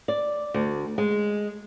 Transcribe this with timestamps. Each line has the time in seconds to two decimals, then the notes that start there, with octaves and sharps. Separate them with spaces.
0.08 D5
0.54 D2
0.98 G#3